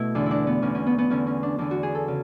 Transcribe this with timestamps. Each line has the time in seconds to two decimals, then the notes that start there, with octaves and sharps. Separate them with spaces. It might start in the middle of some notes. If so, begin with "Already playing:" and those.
Already playing: B2 A3 E4
0.15 E2 D3 D4
0.26 D4 E4
0.47 B3
0.62 E2 D3 C#4
0.75 C#4
0.86 B3
0.98 B3
1.10 E2 D3 C#4
1.27 C#4
1.43 D4
1.58 E2 D3 D4
1.71 F#4
1.83 G#4
1.95 A4
2.08 C#3